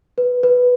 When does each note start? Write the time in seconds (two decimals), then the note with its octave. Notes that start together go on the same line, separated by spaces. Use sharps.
0.18 B4
0.43 B4